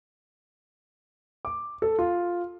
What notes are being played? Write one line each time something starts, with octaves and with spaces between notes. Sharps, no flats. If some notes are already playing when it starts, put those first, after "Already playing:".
D6
A4
F4